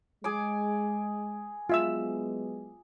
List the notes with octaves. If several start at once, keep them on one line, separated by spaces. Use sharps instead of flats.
G#3 G#4 G#5 D6
F#3 G#3 B3 F4 E5 E6